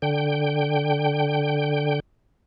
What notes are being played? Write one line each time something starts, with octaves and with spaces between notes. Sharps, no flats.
D3 G5